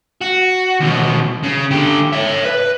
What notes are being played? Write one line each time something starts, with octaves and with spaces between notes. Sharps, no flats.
F#4
D#2 B2
C#3
D3 G4
C#5 E5
B4